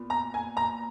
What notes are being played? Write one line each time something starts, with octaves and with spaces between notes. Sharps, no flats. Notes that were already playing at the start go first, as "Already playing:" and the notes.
Already playing: A#2 B3
A#5
G#5
A#5